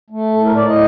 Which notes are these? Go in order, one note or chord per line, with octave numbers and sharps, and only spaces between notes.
A3
A2 A4
A#4
A2 D5
D#5